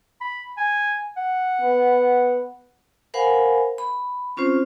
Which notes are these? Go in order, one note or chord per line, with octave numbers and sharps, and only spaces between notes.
B5
G#5
F#5
B3
A#4 C5 F5 F#5 G#5 B5
B5
C4 C#4 F4 C5